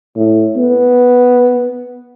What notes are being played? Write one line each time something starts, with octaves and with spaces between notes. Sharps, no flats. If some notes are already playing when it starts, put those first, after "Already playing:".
A2
B3